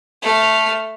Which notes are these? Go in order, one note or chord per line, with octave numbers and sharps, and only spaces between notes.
A3 F6